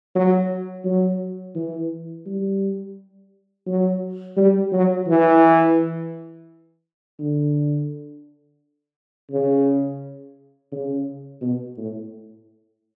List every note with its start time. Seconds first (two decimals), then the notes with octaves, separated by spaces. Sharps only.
0.15 F#3
0.85 F#3
1.56 E3
2.27 G3
3.67 F#3
4.37 G3
4.73 F#3
5.08 E3
7.19 D3
9.31 C#3
10.72 C#3
11.42 B2
11.78 A2